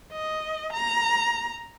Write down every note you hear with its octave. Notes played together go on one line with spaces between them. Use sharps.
D#5
A#5